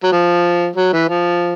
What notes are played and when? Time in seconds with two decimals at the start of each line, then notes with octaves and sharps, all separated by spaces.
0.04 F#3
0.12 F3
0.76 F#3
0.93 E3
1.09 F3